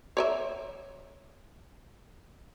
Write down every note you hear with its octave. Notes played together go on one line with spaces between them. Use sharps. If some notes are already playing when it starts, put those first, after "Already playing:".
C#5 D5 E5